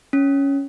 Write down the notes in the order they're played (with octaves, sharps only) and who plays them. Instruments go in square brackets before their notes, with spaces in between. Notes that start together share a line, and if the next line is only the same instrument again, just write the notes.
[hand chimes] C#4